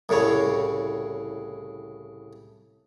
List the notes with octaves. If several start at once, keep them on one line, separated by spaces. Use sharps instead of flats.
C2 A2 C#3 C#5